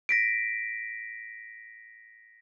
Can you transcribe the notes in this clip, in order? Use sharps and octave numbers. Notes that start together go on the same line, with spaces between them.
A#6 B6 D7